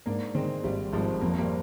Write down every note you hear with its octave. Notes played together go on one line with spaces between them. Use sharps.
G#2 A#3 D4
D#3 G#3 C4
G#1 G3
G#1 F3 G#3
F2 A#3
C4
G3 A#3